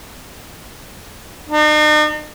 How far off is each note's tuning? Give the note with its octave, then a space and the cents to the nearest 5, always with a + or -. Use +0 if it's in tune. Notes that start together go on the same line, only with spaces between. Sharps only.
D#4 -45